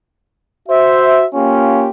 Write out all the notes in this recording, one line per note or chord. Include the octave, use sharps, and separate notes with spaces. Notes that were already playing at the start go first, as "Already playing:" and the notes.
F#4 C5 E5
A#3 C#4 F4 G4